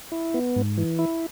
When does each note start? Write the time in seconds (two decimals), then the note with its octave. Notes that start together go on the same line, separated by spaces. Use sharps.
0.12 E4
0.34 B3
0.56 G#2
0.78 E3
0.99 E4